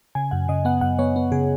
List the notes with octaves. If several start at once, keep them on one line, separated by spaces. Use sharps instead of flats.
C#3 G#5
F#2 F#5
C#3 D#5
B3 F#5
F#2 F#5
B3 C#5
B3
C#3 G#4